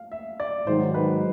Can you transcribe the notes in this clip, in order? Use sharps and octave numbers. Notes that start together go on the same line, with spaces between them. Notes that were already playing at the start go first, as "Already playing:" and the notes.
Already playing: F5
E5
D5
G#2 D#3 F#3 C5
B4